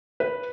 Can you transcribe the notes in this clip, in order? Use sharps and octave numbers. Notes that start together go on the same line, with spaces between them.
B4